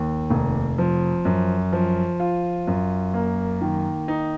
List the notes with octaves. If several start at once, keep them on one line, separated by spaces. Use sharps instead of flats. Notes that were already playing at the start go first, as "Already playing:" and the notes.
Already playing: D#2
F1
F3
F#2
F3
F4
F#2
A#3
D#3
D#4